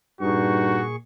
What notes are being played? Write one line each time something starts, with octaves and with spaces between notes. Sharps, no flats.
G2 A#2 D#4 F#4 G#4 C#6